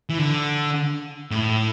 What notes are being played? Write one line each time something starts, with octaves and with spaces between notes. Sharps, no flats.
E3
D3
A2